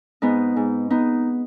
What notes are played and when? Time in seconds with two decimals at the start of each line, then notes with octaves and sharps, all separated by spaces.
0.22 G#2 B3 D#4
0.56 G#2
0.90 B3 D#4